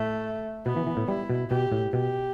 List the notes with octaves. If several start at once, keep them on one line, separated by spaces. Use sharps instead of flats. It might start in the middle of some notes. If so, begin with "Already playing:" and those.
Already playing: A2 A3
B2 B3
E3
E3
A2
G3 E4
B2
B2 G4
A2
B2 G4